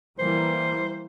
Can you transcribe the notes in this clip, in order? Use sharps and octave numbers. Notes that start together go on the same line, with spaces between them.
E3 G3 A#3 C5